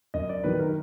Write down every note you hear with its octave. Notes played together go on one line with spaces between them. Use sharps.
F#2 D#5
D5
D#3 F#3 B4
A#4